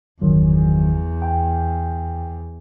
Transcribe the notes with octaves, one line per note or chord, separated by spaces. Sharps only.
G1 E2 D#3 F#3
G5